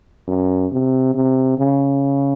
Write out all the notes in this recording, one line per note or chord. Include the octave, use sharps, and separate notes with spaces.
F#2
C3
C3
C#3